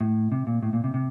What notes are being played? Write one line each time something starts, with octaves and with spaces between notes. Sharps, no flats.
A2
C3
A#2
A2
A#2
C3
C3